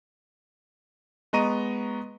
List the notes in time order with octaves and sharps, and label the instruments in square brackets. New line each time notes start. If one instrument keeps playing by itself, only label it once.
[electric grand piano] G#3 B3 D#5 A#5 C#6 D#7